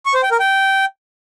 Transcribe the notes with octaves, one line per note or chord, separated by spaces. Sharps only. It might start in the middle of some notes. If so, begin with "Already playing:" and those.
C#6
C5
G5
A#4
G5